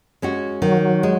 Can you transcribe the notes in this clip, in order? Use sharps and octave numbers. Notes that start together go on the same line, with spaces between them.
G#3 C#4 F#4
D#3 F#3
G#3